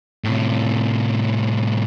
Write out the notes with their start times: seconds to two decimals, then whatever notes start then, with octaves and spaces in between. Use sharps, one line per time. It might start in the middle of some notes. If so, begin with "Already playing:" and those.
0.24 A2 C3